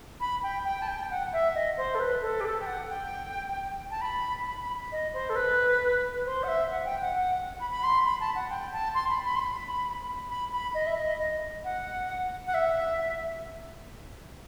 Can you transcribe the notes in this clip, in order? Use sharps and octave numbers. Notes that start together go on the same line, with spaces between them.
B5
G5
G5
A5
G5
F#5
E5
D#5
C5
A4
B4
A4
G4
A4
G5
F#5
G5
A5
B5
B5
B5
D#5
C5
A4
B4
C5
F#5
E5
F#5
G5
F#5
F#5
B5
B5
C6
B5
A5
F#5
G5
A5
C6
B5
B5
C6
B5
B5
B5
D#5
E5
D#5
D#5
F#5
F#5
E5